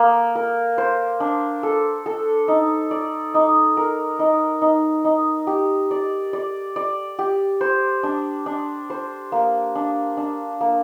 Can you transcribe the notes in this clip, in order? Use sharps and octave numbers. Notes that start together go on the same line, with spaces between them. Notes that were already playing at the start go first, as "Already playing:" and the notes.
Already playing: A#3
A#4
C5
D4
A4
A4
D#4
D5
D#4
A#4
D#4
D#4
D#4
G4
D5
D5
D5
G4
C5
D4
D4
C5
A#3
D4
D4
A#3